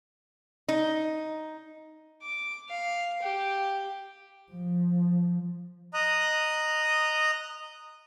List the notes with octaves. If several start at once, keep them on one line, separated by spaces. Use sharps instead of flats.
D#4
D6
F5
G4
F3
D#5 A#5 D#6 F#6